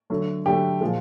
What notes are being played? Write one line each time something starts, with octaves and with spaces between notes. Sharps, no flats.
D3 F#3 A3
D3 F#3 A3 G4
A#2 F3 G#3